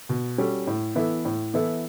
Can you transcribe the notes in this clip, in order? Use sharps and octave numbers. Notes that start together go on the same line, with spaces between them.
B2
G3 C#4 F#4 A4
A2
E3 B3 E4 A4
A2
E3 B3 E4 A4